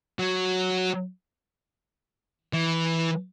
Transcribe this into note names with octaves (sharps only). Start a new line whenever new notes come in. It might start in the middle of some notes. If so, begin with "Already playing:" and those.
F#3
E3